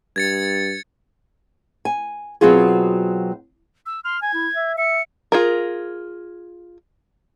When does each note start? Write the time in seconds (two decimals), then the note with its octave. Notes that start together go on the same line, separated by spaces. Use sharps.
0.16 G2 G#6 A6 C#7
1.85 G#5
2.41 B2 F#3 C4 F4 F#4 G#4
3.86 E6
4.05 C6 F6
4.22 G#5 G#6
4.34 E4
4.55 E5
4.78 E5 C#7
5.32 F4 G#4 A#4